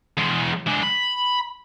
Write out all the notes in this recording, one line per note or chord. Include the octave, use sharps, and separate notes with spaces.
E2 G#3
G#3 D4
B5